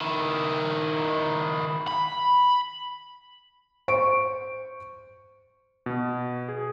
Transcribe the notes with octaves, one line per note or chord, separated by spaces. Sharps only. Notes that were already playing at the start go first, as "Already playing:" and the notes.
D#3 E4
B5
C5 C#6 D7
B2
G#4